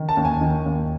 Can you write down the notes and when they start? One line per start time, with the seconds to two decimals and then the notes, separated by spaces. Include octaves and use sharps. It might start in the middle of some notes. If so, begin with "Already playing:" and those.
Already playing: D#3
0.09 A5
0.17 D#2
0.25 G#5
0.41 D#3
0.66 D#2